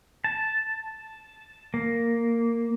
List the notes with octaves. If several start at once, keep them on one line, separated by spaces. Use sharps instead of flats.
A5
A#3